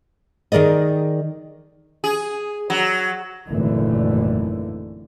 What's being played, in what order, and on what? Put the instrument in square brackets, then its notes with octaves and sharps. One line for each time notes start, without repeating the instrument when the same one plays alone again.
[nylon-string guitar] D#3 G#4 A#4 D5 D#5
[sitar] G#4
F#3
[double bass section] G#1 F#2 A#2 D3 E3 A3